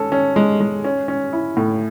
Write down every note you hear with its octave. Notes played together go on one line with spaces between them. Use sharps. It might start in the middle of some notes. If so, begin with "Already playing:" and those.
Already playing: G#3 C#4 A4
C#4
G#3
G#3
C#4
C#4
E4
A2